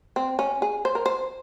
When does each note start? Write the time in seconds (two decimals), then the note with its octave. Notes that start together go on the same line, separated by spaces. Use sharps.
0.16 C4
0.39 C#4
0.62 G#4
0.85 C5
0.95 A#4
1.06 C5